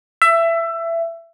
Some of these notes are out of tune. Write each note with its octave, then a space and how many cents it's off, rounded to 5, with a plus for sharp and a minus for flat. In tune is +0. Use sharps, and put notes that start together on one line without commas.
E5 +20